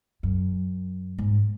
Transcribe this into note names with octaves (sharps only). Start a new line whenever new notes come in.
F#2
G#2